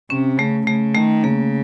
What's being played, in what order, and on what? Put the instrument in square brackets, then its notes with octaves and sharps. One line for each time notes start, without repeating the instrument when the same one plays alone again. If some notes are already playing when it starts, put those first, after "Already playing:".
[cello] C3 [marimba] C#4
[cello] C#3 [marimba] A3
[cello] C#3 [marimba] A3
[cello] D#3 [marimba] A3
[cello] C#3 [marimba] A#3